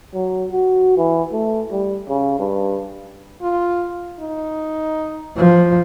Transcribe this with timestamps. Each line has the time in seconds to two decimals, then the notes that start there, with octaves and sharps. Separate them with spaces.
0.14 F#3
0.52 F#4
0.97 E3
1.32 A3
1.71 G3
2.08 C#3
2.39 G2
3.41 F4
4.20 D#4
5.36 F3